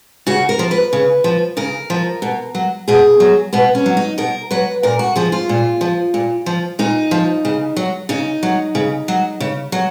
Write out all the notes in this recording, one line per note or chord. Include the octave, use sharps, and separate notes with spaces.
C#3 F#4
A#4
F3
B4
C#3
F3
C#3 A#4
F3
B2
F#3
B2 G#4
F#3
B2 B3
C#4
F#3
D#4
B2 A#4
F#3 B4
A#2 A#4
F#4
F3 G#4
F4
A#2
F3
A#2
F3
A#2 D#4
F3
C#3
F#3
C#3 D#4
F#3
C#3
F#3
C#3
F#3